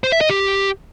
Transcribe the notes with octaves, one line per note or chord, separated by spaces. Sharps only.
C5
E5
D#5
G4